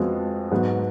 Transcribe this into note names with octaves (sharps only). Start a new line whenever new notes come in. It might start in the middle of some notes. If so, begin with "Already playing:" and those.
Already playing: F2 F3 G#3 B3 F#4
G#2 F#3 B3 F#4